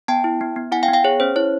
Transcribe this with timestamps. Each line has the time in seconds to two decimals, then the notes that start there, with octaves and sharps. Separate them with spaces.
0.08 B3 G5 A5
0.24 E4
0.41 B3
0.56 B3
0.72 E4 F#5 G#5
0.83 F5 G5
0.88 B3
0.94 F5 G5
1.04 G#4 C#5
1.20 C#4 C5
1.36 E4 C#5